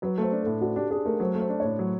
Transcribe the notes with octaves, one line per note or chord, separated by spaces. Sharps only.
F#3 B4
A3 C5
D4
A4
A2
D4 F#4
D4 G4
D4 G#4
A3 A#4
F#3 C5
A3
C5
D4
A2 C#5
F#3